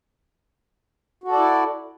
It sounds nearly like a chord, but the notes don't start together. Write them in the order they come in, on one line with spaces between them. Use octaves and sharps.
F#4 A4 D5 E4